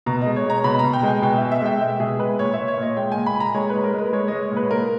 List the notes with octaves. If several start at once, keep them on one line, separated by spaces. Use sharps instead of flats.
B2 A#5
G#3 D#5
C#5
G#3 A#5
B2 B5
B2 A#5
G5
G#3 G#5
B2 G5
B2 E5
E5
G#3 G5
G#3 E5
B2 G#4
G#3 B4
A#2 C#5
E5
A#2
C#5
A#2 D#5
G#3 G5
A#2 G#5
B5
A#2
A#5
G#3 C#5
G#3 B4
A#4
G#3 B4
G#3 C#5
G#3 D#5
C#5
A#2
B4
A#2 A#4